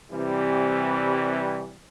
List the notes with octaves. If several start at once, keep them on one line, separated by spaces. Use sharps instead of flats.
C3 E3 G3